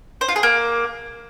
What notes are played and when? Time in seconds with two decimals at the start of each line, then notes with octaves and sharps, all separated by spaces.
0.21 C5
0.28 F4
0.36 G#4
0.43 A#3